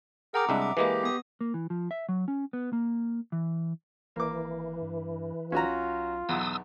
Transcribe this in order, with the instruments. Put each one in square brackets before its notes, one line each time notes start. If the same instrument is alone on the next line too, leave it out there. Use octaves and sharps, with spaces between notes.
[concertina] G#4 A#4 G5 [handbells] F#5 A#5 D6
[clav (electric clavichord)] C2 G#3 D4 [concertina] D#5 E5
[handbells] D6
[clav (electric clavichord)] E3 G#3 A#3 [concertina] G4 [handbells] B4 D#5
[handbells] B3 D#6
[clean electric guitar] A#3
E3
F3
E5
F#3
C#4
B3
A#3
E3
[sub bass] G#1 [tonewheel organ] E3 [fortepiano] A#3 D6
[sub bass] G2
[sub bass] B1 [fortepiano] C#4 F#4 A#5 [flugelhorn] F4
[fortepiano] B1 E2 [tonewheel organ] D#6 E6